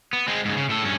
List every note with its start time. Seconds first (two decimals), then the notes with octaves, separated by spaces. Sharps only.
0.13 B3
0.28 G#3 C4
0.45 G#2 C#3
0.57 C#3
0.69 A2 A4
0.83 G2 C#4